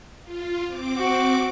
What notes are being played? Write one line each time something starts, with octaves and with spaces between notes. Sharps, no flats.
F4
C4 D6
F#4